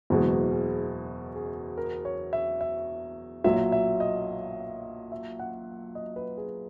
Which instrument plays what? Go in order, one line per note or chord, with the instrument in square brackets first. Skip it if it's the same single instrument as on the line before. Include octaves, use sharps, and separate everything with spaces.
[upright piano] F#1 E2 B2 G#3 [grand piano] B4
[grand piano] G#4
G#4
A#4
C#5
E5
E5
[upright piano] B1 A#2 F#3 [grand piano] E5
[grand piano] E5
D#5
E5
F#5
D#5
B4
G#4